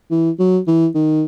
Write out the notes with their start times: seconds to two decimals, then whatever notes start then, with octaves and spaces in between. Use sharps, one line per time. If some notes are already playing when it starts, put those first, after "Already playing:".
0.11 E3
0.39 F#3
0.67 E3
0.95 D#3